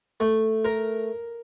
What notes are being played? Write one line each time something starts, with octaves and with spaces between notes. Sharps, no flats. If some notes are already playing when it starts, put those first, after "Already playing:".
A3
A#4